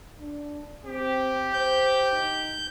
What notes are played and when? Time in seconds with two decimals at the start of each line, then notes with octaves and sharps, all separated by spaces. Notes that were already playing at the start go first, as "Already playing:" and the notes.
0.20 D4
0.85 C4 G4
1.53 C5 G6
2.12 D#4